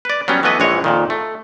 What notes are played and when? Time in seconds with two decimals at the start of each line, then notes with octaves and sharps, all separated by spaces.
0.05 B4 D5
0.28 F#3 G3 B3 C#4
0.43 E3 A3 B3 B4 D#5
0.60 A#1 E3 G#3 C#5
0.84 F2 A#2 D#3
1.10 A3